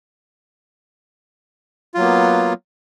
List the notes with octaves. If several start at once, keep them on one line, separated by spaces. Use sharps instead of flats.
F#3 A#3 B3 F4